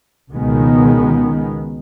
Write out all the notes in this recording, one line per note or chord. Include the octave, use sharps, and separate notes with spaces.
C#2 B2 D#3 G#3 B3